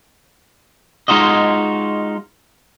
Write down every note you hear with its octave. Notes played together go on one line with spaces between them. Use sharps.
G#3 D#4 F4 F#4 D#5